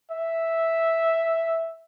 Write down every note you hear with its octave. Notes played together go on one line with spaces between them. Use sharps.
E5